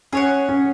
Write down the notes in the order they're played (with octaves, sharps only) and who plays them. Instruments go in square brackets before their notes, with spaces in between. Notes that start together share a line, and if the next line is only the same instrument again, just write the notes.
[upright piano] C#4 [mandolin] G#4 C#5 F#5
[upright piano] C#4